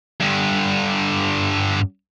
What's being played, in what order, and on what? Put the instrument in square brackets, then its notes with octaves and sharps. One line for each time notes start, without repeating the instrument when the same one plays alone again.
[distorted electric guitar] G2 D3